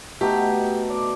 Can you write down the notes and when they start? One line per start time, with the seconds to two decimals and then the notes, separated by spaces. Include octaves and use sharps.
0.21 B2 A3 D#4 G4
0.90 D5